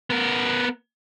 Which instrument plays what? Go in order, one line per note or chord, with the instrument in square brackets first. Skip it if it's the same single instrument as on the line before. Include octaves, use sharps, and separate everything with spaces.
[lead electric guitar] B3 A#4